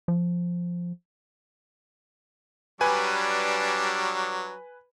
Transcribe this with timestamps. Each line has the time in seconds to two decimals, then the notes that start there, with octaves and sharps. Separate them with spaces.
0.08 F3
2.81 F#3 G3 D4 B4 G#5